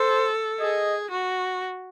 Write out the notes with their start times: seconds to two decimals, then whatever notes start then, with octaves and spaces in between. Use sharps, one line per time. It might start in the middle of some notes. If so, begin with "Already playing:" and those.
Already playing: A4 C5
0.60 G#4 D#5
1.11 F#4